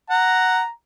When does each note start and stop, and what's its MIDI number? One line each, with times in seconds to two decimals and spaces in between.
0.10 0.62 78
0.10 0.69 82